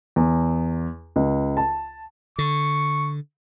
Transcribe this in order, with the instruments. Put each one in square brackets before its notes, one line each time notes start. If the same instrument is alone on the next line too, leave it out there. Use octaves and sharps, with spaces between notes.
[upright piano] E2
C#2
A5
[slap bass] D3 [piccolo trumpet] C#6